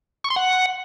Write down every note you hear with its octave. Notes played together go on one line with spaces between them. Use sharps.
C#6
C6
F#5